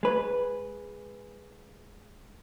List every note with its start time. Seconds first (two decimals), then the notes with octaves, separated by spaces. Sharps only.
0.03 G#3 B4